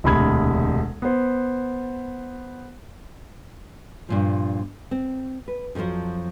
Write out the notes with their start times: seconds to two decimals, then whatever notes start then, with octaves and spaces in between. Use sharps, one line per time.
0.04 E1 D2 C3 B5 G#6
1.02 B3 C5
4.09 G2 A#2 F3
4.91 C4
5.48 B4
5.75 F2 A#2 D#3 F3 F#3